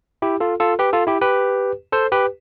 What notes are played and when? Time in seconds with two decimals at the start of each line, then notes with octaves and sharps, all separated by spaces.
0.22 E4 G4
0.40 F4 A4
0.60 F4 A4
0.79 G4 B4
0.93 F4 A4
1.07 E4 G4
1.21 G4 B4
1.92 A4 C5
2.12 G4 B4